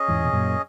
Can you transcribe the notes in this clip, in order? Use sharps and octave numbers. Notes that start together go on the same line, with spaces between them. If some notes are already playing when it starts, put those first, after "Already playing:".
Already playing: C#4 G#4 D#5
E2 G#2
B2
F#2 A#2